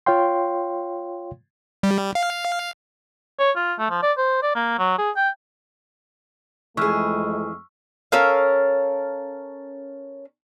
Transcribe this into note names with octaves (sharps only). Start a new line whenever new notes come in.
F4 C#5 F5 G5 C6
G3
F5
C#5
F4
A3
F3
D5
C5
D5
A#3
F#3
G#4
G5
F2 E3 G#3 A3 G#4 C#6 E6 F6
C#4 A4 A#4 F5